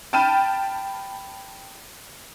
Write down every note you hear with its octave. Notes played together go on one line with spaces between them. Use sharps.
G5 A5 B5 F6 D#7